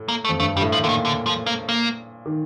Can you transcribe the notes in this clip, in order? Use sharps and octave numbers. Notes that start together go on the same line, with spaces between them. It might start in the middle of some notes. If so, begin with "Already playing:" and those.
Already playing: A2
A#3
A3
F2
G2 A3
G2 G3
A2
F3
A#2 D3
D#3
D3
F3
A#3
A#3
D#3